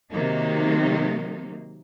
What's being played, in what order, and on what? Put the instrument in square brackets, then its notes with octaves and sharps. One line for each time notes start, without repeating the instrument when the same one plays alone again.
[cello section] C3 D#3 F#3 A#3 D#4